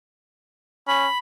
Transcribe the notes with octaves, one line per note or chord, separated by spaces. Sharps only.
C#4 B5